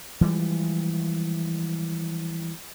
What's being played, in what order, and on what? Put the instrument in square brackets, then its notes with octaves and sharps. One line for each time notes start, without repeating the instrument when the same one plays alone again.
[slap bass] E3 F3 G3 G#3